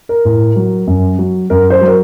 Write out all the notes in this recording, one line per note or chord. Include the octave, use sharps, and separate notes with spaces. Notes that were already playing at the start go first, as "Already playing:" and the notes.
A#4
A2
F#3
F#2
F#3
F#2 A#4
C5
F#3
A#4